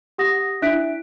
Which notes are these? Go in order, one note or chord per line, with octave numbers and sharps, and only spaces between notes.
G4 F#5 D#6 A#6
D4 E4 E5 F#6 B6 D7